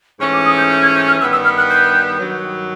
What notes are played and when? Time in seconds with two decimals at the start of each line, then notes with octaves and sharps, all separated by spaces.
0.20 G#2 E3 A3 C#4 C#6
0.33 D6
0.45 D#6
0.57 G6
0.70 G6
0.82 G#6
0.95 G6
1.07 F6
1.20 G2 D#3 G3 B3 E6
1.32 E6
1.44 F6
1.57 F#6
1.69 G6
2.19 G2 D#3 F#3